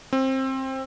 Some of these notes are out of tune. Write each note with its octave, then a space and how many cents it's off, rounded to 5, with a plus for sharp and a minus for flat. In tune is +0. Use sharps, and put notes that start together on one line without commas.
C4 +20